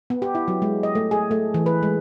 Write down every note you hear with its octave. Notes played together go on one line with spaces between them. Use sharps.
B3
G4
E4
F#3
G#3
D#5
A3
G#4
A3
E3
B4
G#3